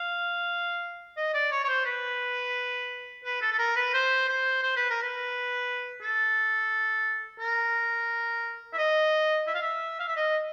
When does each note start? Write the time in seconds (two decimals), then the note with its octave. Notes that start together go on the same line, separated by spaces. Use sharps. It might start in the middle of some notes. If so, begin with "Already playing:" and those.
Already playing: F5
1.17 D#5
1.34 D5
1.51 C#5
1.64 C#5
1.68 C5
1.86 B4
3.24 B4
3.41 A4
3.52 A4
3.59 A#4
3.76 B4
3.94 C5
4.28 C5
4.63 C5
4.76 B4
4.90 A#4
5.03 B4
6.01 A4
7.40 A#4
8.73 E5
8.78 D#5
9.47 E5
9.54 F5
9.62 E5
10.00 F5
10.08 E5
10.16 D#5